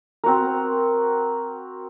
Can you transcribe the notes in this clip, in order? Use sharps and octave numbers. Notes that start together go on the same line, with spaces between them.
C4 F#4 A#4